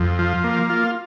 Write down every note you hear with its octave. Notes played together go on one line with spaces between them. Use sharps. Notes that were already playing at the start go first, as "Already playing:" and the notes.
Already playing: F2
F3
A#3
F4